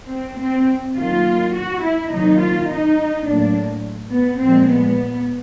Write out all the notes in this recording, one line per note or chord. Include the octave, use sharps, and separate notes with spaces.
C4
C4
D#3 F#3 A#3 F4
F#4
E4
C3 D#3 F#3 A#3 D#4
F4
D#4
A2 F#3 A#3 D4
B3
A#2 F3 G#3 C4
B3